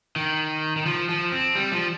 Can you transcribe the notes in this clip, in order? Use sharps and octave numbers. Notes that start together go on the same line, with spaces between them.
D#3
D#3
F3
F3
C4
G3
F3